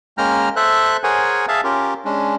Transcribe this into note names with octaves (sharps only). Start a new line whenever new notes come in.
G#3 A#3 C#4 G5 A#5 F6
A4 C5 E5 F#6
G#4 A#4 C5 C#5 F#5 G#5
G#4 E5 F5 A5
C#4 F4 G4 A#4
G#3 C#4 D4